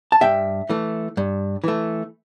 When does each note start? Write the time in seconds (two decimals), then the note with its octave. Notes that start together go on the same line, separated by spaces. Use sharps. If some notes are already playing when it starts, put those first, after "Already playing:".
0.12 A5
0.21 G2 E5 G5
0.69 E3 A3
1.17 G2
1.64 E3 A3